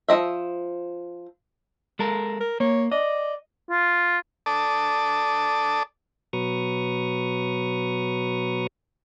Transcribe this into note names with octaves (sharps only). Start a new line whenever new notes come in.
F3 C4 D#5 E5
G#3 A4 A#4
A#4
A#3 C#5
D5 D#5
F4
A4 D5 A5 D6 D#6
B2 F#3 B4 A#5 C#6 D#6